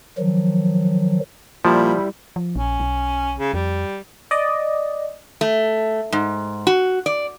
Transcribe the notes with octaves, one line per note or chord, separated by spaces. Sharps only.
D#3 F3 F#3
A#2 F3 G3 E4 G4
F3
A#1 C#4
B1
C#3
F2 G3
D5 D#5
A3
G#2
F#4
D5